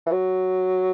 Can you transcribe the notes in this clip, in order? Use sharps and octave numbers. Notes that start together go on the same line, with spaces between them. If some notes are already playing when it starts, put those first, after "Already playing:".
E3
F#3